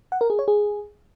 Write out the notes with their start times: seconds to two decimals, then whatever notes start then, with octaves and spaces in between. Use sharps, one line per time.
0.12 F#5
0.21 A#4
0.30 G#4
0.39 C#5
0.48 G#4